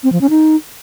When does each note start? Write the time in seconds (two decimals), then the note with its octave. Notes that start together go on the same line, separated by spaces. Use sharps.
0.03 C4
0.12 F3
0.21 C#4
0.30 D#4